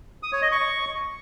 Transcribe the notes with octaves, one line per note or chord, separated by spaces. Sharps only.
D#6
C#5
D#5
C#6